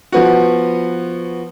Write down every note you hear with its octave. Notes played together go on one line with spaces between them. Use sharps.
F3 B3 F#4